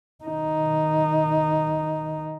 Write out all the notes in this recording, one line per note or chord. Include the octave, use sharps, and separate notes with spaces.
D#3 D#4